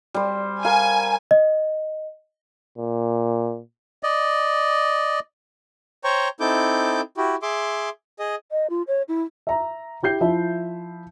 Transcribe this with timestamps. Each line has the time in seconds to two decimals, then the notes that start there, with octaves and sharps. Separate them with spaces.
0.14 G3 C5
0.65 A#4 F5 G#5
1.31 D#5
2.78 A#2
4.03 D5 D#5
6.04 C5 C#5 G5 A#5 C#6
6.40 C4 D#4 E4 A4 D6 G6
7.17 E4 F#4 G4
7.42 G#4 E5 C6 D6
8.19 G#4 D#5
8.51 D#5
8.70 F4
8.88 C#5
9.08 E4
9.47 E5 A#5
10.03 E4 G4 G6 C7
10.21 F3 E4 E5